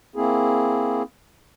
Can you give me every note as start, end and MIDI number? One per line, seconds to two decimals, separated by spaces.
0.16 1.03 58
0.16 1.03 60
0.16 1.03 64
0.16 1.03 68